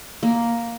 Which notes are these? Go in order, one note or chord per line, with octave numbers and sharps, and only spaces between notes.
A#3